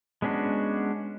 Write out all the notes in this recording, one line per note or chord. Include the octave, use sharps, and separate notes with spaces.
G#3 B3 C#4 D4 F#4